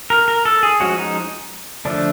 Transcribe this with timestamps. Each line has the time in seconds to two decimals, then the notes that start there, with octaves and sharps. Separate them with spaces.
0.10 A#4
0.28 A#4
0.45 A4
0.63 G#4
0.80 F3 G#3 C#4 F#4
0.98 D#4
1.85 D3 F3 A3 D4